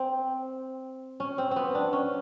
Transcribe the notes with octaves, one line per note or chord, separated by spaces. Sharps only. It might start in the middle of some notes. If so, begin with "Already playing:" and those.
Already playing: C4
C#4
C4
B3 C4
D4
C#4